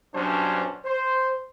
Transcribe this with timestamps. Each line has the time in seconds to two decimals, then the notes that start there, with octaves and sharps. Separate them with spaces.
0.15 B1 G2 F#3 C#4 D4 C5
0.85 C5